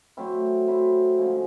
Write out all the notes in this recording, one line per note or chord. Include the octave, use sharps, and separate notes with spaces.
F#3 A3 C4 E4
F#3 A3 C4 E4
D3 F3 G#3 C#4